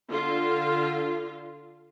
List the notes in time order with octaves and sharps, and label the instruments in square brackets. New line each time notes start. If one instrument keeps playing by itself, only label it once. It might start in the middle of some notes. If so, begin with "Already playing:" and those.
[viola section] D3 F4